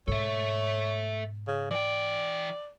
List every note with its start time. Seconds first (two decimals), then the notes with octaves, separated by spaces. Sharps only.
0.08 G#2 B2 A4 C#5 E5
1.47 C#3
1.71 E3 D5 G5